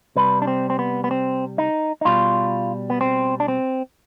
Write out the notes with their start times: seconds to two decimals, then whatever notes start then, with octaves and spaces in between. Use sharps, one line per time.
0.16 C3 G3 B4
0.42 D4
0.47 C4
0.70 C4
0.79 B3
1.04 B3
1.11 C4
1.58 D#4
2.01 D#4
2.05 B2 G3 F4
2.90 B3
3.01 C4
3.40 D4
3.48 C4